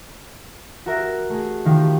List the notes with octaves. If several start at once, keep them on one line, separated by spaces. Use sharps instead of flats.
F#4 A#4 E5
A3 G#4
D#3 F3 G4